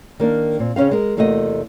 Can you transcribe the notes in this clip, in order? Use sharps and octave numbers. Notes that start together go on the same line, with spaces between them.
D#3 A#3 D4
A#2 C4
C#3 C4 C#4 D#4 F5
G#3 A#4
E2 C3 A3 A#3 F#4 D#5